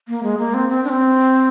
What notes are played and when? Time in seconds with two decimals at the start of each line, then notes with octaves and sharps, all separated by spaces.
0.08 A#3
0.23 G#3
0.38 A#3
0.54 C4
0.69 C4
0.84 D4
0.89 C4